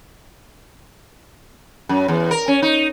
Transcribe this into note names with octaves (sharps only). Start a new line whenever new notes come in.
F#2
E2
A#4
C#4
D#4